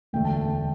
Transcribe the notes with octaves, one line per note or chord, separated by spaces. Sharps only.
E1 D2 D3 A3 G5
A5
G5